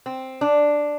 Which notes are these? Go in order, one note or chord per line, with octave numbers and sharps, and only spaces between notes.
C4
D4